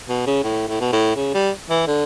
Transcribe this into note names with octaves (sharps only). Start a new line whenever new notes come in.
B2
C#3
A2
A2
B2
A2
C#3
G3
E3
D3